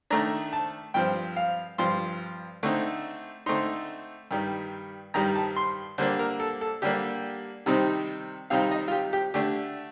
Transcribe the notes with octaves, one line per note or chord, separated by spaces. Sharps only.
D#3 A3 D4 A#5
A5
G2 F3 C4 G5
F5
G2 F3 C4 C6
D3 A3 C4 D#4
D3 A3 C4 D#4 C6
G2 D#3 G3
G2 D#3 G3 A#5
A5
C6
D3 G3 A#3 D4 C5
A#4
A4
A4
D3 G3 A#3 D4 G4
C3 D#3 G3 C4 D#4
C3 D#3 G3 C4 D#4 F5
D#5
F4
G4
G4
D3 A3 D4 G4